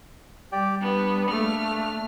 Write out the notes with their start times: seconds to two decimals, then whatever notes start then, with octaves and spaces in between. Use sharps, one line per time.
0.52 G3 G4 D5 G5
0.81 B3 D4
1.30 A3 A#3 F6